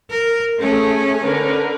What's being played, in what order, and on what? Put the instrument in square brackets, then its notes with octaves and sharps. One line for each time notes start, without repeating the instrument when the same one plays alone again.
[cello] A#4
[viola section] A3 G#4 [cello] C#4
[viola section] D3 A#4 B4